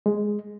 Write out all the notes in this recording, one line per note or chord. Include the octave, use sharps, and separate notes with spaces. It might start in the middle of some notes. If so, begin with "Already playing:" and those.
G#3